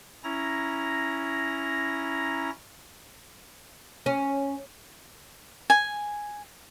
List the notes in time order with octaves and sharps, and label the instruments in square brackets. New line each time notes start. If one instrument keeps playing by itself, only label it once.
[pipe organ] C#4 E4 A#5 A#6
[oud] C#4
[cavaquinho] G#5